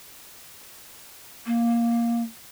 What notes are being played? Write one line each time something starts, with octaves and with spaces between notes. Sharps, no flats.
A#3